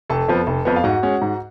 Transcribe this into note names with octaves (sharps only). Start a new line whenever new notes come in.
F1 A4 A5
F2 F3 B3
F1
F2 F3 B3
F5
G#2 F#4 F#5
G#3 C#4
G#2